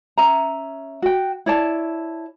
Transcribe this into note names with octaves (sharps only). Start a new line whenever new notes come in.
C#4 E5 A#5
F#4 G5
E4 C#5 D5 A5